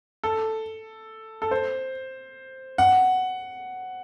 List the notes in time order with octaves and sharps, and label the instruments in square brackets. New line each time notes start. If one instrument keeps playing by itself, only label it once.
[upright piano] A4
A4
C5
F#5